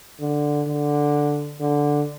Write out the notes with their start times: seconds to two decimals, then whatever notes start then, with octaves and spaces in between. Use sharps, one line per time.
0.21 D3
0.68 D3
1.60 D3